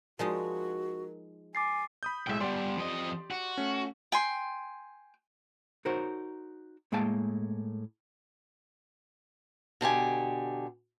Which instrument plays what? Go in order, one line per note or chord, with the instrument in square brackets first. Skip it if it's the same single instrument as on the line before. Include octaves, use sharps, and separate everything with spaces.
[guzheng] F3 G#3 D#4 [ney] F#4 [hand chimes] A#4
[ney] G#5 [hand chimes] D6 A6 C7
[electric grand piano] B5 D#6 G6
[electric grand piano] B1 A2 G#3 [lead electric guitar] E5 G5
[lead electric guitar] G3 B3 [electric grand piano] G4 D5 C6
[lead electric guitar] F2 D#5
F#4
[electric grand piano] A3 C#4
[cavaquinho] G5 G#5 C6
[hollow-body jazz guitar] D#4 F#4 A#4 C5 C#5
A2 G#3 A#3 F5 G5 A5
[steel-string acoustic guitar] B2 D3 G4 G#5